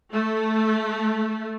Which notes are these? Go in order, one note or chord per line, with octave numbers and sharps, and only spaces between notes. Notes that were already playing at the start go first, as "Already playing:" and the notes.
A3